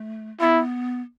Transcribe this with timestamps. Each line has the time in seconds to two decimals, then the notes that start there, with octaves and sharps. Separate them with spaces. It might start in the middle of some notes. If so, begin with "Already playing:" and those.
Already playing: A3
0.40 B3 E4